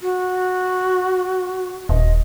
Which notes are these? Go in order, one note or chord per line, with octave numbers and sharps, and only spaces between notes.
F#4
D#1 D#5